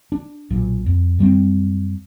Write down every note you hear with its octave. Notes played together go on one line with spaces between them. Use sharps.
D4
B1 A#2
F2
F#2 G3 G#3 C4